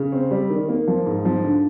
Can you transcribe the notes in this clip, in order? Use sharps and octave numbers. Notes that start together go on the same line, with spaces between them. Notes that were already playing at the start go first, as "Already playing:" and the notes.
Already playing: C#3
C4
G3
D#3
A#3
F3
G#2
F3
D3